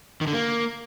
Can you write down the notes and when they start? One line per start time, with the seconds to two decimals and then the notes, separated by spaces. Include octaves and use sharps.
0.21 D#3
0.27 D3
0.33 A#3